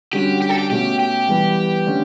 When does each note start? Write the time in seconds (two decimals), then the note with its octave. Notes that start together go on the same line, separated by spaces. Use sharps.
0.13 D3 G3 C#4 F#4 G4
0.42 G4
0.50 A4
0.59 G4
0.71 B2 A3 C#4 G4
1.00 G4
1.28 E3 G3 B3
1.87 D3 A3 C#4